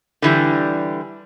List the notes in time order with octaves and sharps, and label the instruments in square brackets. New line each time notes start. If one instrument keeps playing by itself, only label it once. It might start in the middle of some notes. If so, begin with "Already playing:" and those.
[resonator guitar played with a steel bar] D3 E3 G3